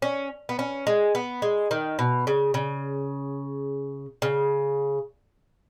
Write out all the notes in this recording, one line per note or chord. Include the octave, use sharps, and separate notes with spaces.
C#4
B3
C#4
G#3
B3
G#3
D#3
B2
C#3
C#3
C#3